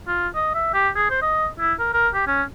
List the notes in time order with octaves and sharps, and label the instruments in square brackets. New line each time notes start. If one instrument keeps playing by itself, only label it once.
[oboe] F4
D#5
E5
G4
G#4
C5
D#5
E4
A#4
A#4
G4
C#4